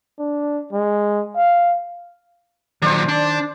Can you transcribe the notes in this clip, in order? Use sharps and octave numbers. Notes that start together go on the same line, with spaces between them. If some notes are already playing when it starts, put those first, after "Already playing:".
D4
G#3
F5
A#2 D#3 F#3 C5 D5
D4